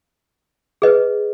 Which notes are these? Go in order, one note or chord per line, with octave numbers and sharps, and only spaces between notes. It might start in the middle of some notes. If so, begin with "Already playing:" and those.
G#4 B4 D#5